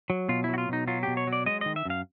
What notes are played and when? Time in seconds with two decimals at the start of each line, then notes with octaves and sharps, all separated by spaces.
0.10 F#3
0.29 B2 F4
0.44 F#3 E4
0.54 F#4
0.58 F4
0.69 B2 D#4
0.88 F#3 F4
1.03 B2 G4
1.17 C#5
1.27 F#3
1.33 D5
1.46 G#3 D#5
1.61 D#3 D#5
1.76 E5
1.85 F#2 F5